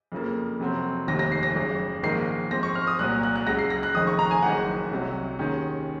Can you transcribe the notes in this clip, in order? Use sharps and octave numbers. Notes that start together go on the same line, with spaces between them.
F2 C#3 F3 A#3
F2 C3 F#3 C4
F1 D#2 D#3 A#6
A#6
C7
A#6
G#1 F#2 C#3
A#1 G#2 D#3 A#3 C7
G#2 F3 C4 A#6
C#6
F6
D#6
C2 A#2 F#3 F#6
F#6
F#6
C#2 C#3 F#3 A#6
C7
A#6
F#6
F1 F2 D#3 G#3 D#6
C#6
A#5
G#5
F#1 F#2 D#3 G#3 F#5
C2 C3 F#3
D#2 D#3 G#3 C#4